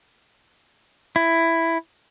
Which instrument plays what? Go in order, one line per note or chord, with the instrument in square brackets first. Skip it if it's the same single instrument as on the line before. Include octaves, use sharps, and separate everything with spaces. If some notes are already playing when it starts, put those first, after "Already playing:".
[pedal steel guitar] E4